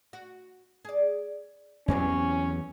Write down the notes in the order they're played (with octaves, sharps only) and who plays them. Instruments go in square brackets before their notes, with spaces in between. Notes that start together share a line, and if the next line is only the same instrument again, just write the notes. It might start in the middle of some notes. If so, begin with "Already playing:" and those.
[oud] F#4
G#4 D5
[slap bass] E2 E3 F#3 [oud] C4 G4 C#5 [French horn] C#4